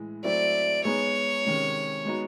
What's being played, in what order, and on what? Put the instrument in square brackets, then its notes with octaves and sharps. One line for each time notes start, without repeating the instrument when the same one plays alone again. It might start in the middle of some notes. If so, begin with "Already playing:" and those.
Already playing: [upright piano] A2 E3 G#3
[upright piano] F#3 A3 C4 E4 [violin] D5
[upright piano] G#3 B3 D#4 G#4 [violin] C#5
[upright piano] C3 D#3 G#3 C#4
G#3 B3 D#4 F#4